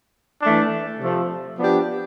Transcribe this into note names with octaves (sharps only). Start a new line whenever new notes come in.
E3 A3 D4
C3 F3 A3
F3 B3 D4 G4